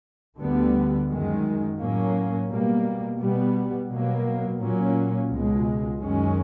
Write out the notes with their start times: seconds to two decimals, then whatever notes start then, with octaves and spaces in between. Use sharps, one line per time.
0.38 D2 D3 G3 B3
1.08 F#2 D#3 G#3
1.78 A2 F#3 A#3 C#4
2.48 B2 G3 A#3
3.19 B2 G3 B3
3.89 B2 F#3 A#3
4.58 A#2 F#3 A#3 C#4
5.29 C#2 B2 G#3
5.99 F#2 D#3 G#3 C#4